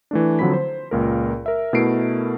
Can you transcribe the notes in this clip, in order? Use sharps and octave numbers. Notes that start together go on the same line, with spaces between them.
E3 A3 D4
D3 F3 F#3 C4 B5 B6
C5
C#2 A#2 A#4
A#4 E5
B2 A3 E4 A#4 C7 D7